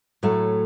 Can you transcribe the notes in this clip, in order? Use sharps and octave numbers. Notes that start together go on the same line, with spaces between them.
A2 F#3 A3